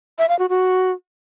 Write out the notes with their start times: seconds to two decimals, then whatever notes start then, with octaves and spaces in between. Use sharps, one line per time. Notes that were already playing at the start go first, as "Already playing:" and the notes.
0.18 E5
0.29 F5
0.39 F#4
0.49 F#4